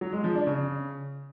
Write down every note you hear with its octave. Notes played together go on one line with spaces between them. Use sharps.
F#3
G#3
F3
D4
C#3